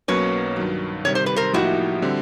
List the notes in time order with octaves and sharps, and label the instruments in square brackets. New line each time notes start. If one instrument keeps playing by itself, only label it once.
[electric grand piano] B1 B2 F#3 A#3 C#4 [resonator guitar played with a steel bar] B4 C#5
[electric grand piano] G2 D#3 F#3
[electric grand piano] C3 D#3 G3 [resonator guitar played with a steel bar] C#5
[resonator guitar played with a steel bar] C5
B4
A#4 C5
[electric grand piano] A2 F3 A#3 D#4 G4 [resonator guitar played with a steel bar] E4 F#4
[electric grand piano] D3 G3 C4